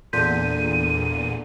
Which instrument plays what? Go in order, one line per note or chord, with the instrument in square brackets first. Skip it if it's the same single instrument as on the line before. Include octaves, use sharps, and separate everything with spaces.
[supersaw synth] E2 A#2 [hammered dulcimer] D3 [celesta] C6 G6 B6 [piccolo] D#7